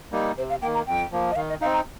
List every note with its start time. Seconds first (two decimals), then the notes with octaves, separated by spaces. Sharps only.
0.12 G3 A#3 D#4
0.37 C3 C5
0.50 F5
0.62 D#3 A#3 G5
0.74 A#5
0.87 F2 G5
1.12 F3 A#3
1.31 D#5
1.36 D#3 F5
1.49 D#5
1.61 D#4 F5
1.65 C4
1.73 A#5